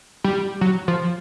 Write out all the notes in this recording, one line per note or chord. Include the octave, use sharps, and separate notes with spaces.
G3
F#3
F3